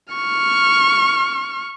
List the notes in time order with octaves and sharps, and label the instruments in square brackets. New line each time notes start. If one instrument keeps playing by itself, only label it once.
[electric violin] C#6 F6